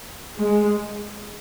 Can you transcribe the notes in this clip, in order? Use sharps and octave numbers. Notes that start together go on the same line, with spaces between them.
G#3